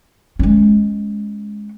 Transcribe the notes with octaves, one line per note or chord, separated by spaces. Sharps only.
G#3 C#4